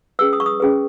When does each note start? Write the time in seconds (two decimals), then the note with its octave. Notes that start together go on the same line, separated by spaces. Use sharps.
0.19 C#4 G#4 B4 E6
0.33 D#6
0.40 C#6
0.46 D#6
0.60 C#4 G#4 B4